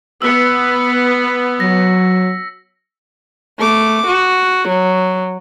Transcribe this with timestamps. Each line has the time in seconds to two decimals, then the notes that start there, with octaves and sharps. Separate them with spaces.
0.22 B3 E6 B6 C#7
1.60 F#3 A#6
3.59 A3 D6
4.07 F#4
4.69 F#3